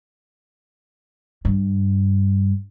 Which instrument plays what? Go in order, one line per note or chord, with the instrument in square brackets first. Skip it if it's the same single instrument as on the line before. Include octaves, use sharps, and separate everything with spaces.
[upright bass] G2